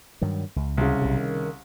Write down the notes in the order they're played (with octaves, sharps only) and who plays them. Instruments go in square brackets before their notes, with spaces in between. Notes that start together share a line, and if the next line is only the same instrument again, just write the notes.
[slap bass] G2 D#3 F#3
C#2
[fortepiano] C2 C#3
[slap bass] B1 C3
D#3